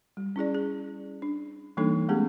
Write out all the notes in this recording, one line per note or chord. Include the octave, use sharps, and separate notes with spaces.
G3
C#4 E4 G#4 D5
G#4
D4
E3 G3 A#3 D4 D#4 A4
G#3 A3 B3 C#4 G4 G#4